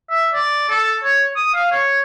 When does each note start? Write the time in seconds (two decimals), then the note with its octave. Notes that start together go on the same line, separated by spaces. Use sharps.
0.10 E5
0.34 D5
0.69 A4
1.03 C#5
1.36 D#6
1.54 F5
1.72 C#5